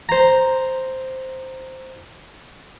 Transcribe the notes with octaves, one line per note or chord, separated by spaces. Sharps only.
C5 A#5